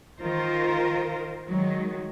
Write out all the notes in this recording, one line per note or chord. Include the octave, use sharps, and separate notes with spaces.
D#3 F4 A#4 C5
D#3 F#3 G#3